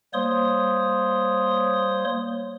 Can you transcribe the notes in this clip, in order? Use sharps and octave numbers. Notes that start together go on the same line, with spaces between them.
G3 A#3 C5 C#5 C6 D#6